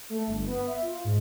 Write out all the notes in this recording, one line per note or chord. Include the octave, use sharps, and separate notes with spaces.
A3
G1
B3
E5
F4
G#2